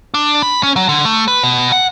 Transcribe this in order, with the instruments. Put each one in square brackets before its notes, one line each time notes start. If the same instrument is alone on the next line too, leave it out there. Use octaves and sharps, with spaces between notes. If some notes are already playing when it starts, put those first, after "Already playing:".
[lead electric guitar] D4
B5
C#4
F#3
D3
A3
B4
B2
F#5